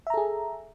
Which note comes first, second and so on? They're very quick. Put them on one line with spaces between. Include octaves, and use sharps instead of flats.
E5 A#5 A4 G#4